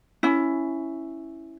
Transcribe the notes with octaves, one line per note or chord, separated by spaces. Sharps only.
C#4 E4